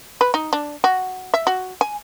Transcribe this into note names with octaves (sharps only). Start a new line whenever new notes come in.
B4
D#4
D4
F#4
E5
F#4
G#5